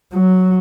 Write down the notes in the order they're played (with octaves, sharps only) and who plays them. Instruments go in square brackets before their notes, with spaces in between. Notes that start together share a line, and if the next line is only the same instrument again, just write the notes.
[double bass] F#3